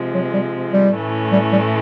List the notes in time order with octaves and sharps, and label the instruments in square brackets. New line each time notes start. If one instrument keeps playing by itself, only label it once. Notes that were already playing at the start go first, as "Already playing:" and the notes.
Already playing: [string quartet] C3 F3 G#3
[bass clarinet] F#3
G3
G3
[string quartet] A2 E3 A3 C#4
[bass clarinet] G3
G3